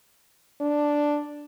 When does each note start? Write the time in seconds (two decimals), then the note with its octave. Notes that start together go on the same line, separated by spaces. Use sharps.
0.61 D4